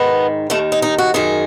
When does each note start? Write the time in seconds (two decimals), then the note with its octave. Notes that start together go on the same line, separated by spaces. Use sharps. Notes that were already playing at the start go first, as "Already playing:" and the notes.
Already playing: G#2 D#3 B3
0.50 D#2 D#3 A3
0.72 D#4
0.82 D#4
0.98 F#4
1.14 F#2 D#3 G#4